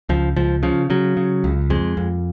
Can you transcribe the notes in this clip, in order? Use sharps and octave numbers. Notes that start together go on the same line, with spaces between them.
C#2 F3
C#2 F3
C#3 F3
C#3 F#3
C#3
C#2
F2 G#3
F2